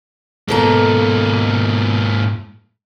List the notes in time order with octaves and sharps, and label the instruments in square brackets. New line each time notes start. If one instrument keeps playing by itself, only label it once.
[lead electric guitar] G#2 A#3 [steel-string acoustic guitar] B2 A4 A#5